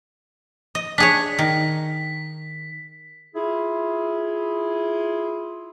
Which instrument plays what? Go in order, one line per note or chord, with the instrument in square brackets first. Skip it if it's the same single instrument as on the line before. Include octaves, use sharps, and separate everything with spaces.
[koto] D#5
[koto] D4 G#4 C#5 [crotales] B6
[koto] D#3
[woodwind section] E4 F4 G#4